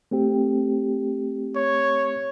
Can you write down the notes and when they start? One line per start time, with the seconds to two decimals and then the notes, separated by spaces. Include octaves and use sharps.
0.11 A3 C4 G4
1.56 C#5